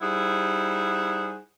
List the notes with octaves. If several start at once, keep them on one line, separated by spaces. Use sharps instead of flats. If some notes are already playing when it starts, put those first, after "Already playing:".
G3 D#4 E4 G#4 C5 F#5